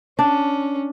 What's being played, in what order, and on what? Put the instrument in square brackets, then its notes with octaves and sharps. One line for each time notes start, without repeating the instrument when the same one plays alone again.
[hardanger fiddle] C#4 [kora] D4